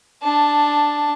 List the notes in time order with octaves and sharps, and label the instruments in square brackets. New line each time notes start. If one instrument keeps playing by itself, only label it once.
[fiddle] D4 A5